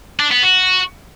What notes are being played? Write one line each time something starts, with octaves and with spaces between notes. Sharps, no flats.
D4
B3
F#4